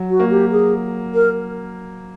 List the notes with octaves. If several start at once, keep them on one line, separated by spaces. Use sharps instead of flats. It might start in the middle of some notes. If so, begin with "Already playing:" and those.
Already playing: F#3
F#4
A#3
G4
G#4
A#4